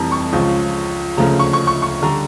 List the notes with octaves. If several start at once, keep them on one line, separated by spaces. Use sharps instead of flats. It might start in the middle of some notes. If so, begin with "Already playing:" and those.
Already playing: F1 F2 E3 G3 A5 A#5
C#6
C#2 C#3 F3
D2 C#3 F3 A#5
C#6
C#6
C#6
C#6
D3 G3 A#5